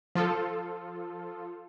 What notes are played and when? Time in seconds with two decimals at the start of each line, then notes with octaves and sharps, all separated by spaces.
0.15 F3 F4 A4